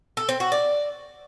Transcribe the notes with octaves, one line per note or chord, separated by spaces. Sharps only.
A4
C4
F#4
D5